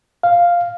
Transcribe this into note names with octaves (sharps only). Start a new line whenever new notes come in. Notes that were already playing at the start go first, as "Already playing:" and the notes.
F5